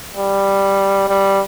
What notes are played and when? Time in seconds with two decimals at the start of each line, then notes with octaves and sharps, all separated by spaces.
0.17 G3
1.08 G3